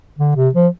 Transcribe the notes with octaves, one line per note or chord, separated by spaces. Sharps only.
D3
C3
F3